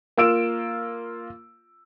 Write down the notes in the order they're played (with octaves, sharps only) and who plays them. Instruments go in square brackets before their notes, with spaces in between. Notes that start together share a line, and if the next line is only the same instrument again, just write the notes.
[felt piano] A#3 F4 E6 D7 E7